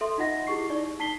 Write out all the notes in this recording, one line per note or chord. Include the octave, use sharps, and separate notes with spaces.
A4 E5 C6
D#4 F4 D#5 F#5 A#6
E4 G4 G#4 C#6 C7
D#4 D5
D#4 A5 B6 C7 G7